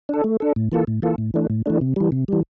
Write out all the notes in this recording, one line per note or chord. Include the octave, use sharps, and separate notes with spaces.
D4 A4
A3
D4 A4
A2
E3 A#3 F4 A4
A2
E3 A#3 F4 A4
A2
E3 A3 D4
A2
E3 A3 D4
C3
E3 G3
C3
E3 G3